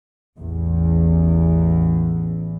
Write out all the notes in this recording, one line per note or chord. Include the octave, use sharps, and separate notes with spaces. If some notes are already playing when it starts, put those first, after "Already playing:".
A1 E2